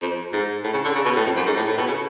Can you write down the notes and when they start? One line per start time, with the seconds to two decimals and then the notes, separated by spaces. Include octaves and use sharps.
0.02 F2
0.33 G#2
0.64 A2
0.73 C#3
0.84 D3
0.95 C#3
1.05 B2
1.16 A2
1.25 F2
1.36 F#2
1.46 G#2
1.56 A2
1.68 A2
1.78 B2
1.87 C#3